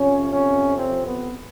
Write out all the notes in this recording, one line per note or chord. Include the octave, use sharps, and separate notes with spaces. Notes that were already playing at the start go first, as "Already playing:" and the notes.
Already playing: F2 C3 F3 C#4
C#4
C4
B3